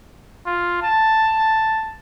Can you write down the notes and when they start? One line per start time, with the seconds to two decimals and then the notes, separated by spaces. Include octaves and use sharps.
0.46 F4
0.83 A5